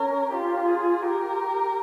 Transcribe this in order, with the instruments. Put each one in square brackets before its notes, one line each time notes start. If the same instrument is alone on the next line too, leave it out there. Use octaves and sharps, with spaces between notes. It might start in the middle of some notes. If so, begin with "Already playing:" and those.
Already playing: [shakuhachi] C#4 [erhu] A#4
[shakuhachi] F4 [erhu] G4
[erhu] G#4
[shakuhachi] G4 [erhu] A#4